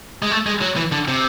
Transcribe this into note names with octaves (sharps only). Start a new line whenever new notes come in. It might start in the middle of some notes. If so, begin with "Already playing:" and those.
G#3
A3
G#3
F#3
E3
D3
C3